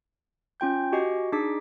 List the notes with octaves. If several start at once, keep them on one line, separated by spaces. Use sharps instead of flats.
C#4 F4 G5 G6
F#4 G4 D#5 G#5 C7
D4 D#4 G#4 D6 B6